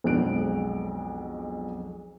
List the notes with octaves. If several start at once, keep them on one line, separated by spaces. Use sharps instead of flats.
B1 F2 G#3 D4 F#6 D7